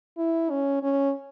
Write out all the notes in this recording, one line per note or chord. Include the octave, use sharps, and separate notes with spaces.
E4
C#4
C#4